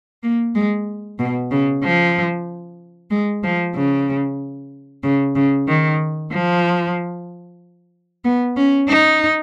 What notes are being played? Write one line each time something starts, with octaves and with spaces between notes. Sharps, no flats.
A#3
G#3
B2
C#3
F3
G#3
F3
C#3
C#3
C#3
D#3
F3
B3
C#4
D#4